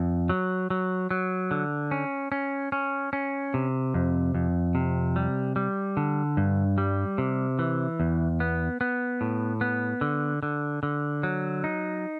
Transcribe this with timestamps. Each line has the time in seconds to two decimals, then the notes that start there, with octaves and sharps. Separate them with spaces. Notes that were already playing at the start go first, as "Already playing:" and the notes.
Already playing: F2
0.29 F#3
0.70 F#3
1.11 F#3
1.51 D3
1.91 C#4
2.32 C#4
2.72 C#4
3.13 C#4
3.54 C3
3.94 F2
4.35 F2
4.75 C3
5.16 G3
5.56 G3
5.97 D3
6.37 G2
6.78 G3
7.18 C3
7.59 E3
8.00 E2
8.40 B3
8.81 B3
9.21 A2
9.61 B3
10.01 D3
10.43 D3
10.83 D3
11.23 F#3
11.64 D#4